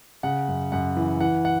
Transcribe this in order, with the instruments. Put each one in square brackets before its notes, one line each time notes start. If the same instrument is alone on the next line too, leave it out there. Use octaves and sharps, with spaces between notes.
[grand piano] C#3 F#5
F#2
F#2 F#5
E3
E3 F#5
F#5